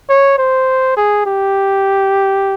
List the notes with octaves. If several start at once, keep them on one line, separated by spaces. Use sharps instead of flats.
C#5
C5
G#4
G4